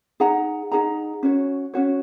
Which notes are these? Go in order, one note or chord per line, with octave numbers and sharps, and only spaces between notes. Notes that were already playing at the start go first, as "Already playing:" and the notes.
D#4 G#4 F#5 A#5
D#4 G#4 F#5 A#5
C#4 F#4 C#5
C#4 F#4 C#5